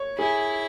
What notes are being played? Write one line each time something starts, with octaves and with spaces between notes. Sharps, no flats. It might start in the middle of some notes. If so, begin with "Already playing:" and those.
Already playing: C#5
E4 G#4